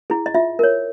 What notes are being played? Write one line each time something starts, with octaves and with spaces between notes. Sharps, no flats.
E4 G#4
D#5
F4 E5
A#4 C#5